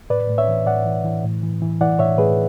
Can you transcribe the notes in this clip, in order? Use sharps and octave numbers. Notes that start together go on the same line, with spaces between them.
A2 B4 D5
A2
C#5 E5
E3
A2 D5 F#5
E3
E3
A2
E3
E3
E3 D5 F#5
A2 C#5 E5
A2 G#4 B4